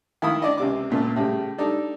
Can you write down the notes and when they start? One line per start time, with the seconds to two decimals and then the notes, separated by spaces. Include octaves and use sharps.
0.22 D#3 E4 F5 B5 D#6
0.42 D4 D5 D#5
0.58 C#2 C3 D6
0.90 C#2 A#2 A3
1.16 A2 C#3 G3
1.58 G3 D4 D#4 A4